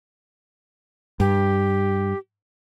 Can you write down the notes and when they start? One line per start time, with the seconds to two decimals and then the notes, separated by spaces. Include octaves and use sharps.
1.20 G2 G4